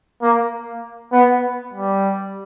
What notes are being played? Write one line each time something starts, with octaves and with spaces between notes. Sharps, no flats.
A#3
B3
G3